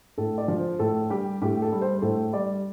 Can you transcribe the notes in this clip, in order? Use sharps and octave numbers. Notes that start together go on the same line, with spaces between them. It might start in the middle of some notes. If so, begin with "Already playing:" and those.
A2 A4
D5
F3
C5
A2 A4
G3 G4
A2 G4
A4
G3
C5
C5
A2 A4
G3 D5